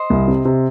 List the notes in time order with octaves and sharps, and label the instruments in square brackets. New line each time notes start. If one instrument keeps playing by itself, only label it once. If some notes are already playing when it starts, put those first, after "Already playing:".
Already playing: [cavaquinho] C5 D#5
[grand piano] C2
C3
C3